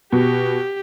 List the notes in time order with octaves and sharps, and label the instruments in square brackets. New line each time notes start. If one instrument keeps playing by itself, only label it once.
[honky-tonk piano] B2 [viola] G4